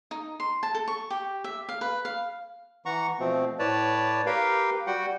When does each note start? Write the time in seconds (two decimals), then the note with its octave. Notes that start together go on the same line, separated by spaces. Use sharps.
0.11 D#4
0.40 C6
0.63 A5
0.75 A4
0.88 C#6
1.10 G4
1.44 E5
1.69 F5
1.81 B4
2.05 F5
2.86 E3 F#5 A#5 C#6
3.20 B2 F3 A3 C4
3.59 A2 B4 C#5 D5 A5
4.26 G4 A#4 B4 F5 G5
4.87 G3 F#4 F#5 G5